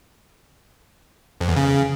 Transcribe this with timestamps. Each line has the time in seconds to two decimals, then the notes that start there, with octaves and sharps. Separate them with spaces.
1.41 F2
1.48 E2
1.56 C#3